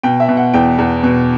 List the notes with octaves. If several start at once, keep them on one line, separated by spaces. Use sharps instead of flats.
B2 G5
E5
B2
F#5
E2 G5
E2
B2